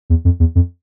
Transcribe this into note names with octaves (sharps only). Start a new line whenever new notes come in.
E2
F2
E2
F2